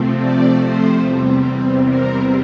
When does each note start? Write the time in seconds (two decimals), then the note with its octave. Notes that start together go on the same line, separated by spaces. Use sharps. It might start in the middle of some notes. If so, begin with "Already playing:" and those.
Already playing: C3 F3 A3 C4
0.17 D5
0.60 C5
1.00 E2 C3 G3 C4
1.85 A#4